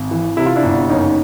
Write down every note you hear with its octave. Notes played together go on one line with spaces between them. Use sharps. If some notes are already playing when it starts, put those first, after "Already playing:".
Already playing: G#1
E3
C3 E4
F4
D4 E4
G1
F#1 C#4 D#4